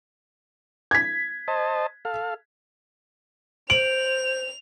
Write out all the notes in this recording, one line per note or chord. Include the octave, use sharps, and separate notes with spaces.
G#6 B6
C5 D#5 A5
A4 F5
C5 D7 F7 F#7